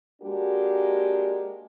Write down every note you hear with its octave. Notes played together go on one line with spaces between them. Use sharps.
G#3 A#3 D4 F#4 G4 A#4